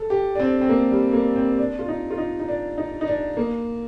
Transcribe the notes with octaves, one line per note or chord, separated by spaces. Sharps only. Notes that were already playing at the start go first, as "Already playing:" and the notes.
Already playing: A4
G4
D4
C4
C4
A#3
G3
A#3
C4
D4
F4
D#4
F4
D#4
D#4
D4
D#4
D#4
D4
A#3